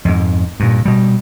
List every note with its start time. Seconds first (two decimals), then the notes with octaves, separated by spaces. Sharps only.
0.05 F2 G#2
0.60 G2 A#2
0.85 B2 G3